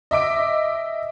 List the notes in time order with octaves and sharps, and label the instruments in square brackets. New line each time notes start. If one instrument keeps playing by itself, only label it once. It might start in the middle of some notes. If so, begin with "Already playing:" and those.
[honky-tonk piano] D#5 E5 D6 D7